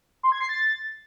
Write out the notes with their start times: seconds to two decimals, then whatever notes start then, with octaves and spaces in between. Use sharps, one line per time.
0.23 C6
0.32 G#6
0.41 C7
0.49 A6